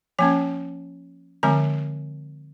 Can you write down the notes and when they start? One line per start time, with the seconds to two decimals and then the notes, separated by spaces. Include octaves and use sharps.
0.19 F3 A#3 C#4 G#5
1.43 D3 F3 G#3 C4 G#5